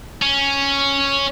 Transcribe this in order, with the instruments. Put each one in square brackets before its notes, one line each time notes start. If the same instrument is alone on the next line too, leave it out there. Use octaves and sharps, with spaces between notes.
[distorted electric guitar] C#4